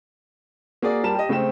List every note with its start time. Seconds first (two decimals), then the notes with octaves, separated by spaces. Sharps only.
0.82 A#3 F#4 G#4 D5
1.04 G3 A#4 A5 E7
1.15 G4 D#5
1.29 C#3 A3 C4 G5 E7